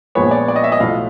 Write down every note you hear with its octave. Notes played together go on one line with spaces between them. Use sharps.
A#1 A#2 F3 G#3 B3 C#5
D5
D5
D#5
E5
D#5
B1 A2 F3 F5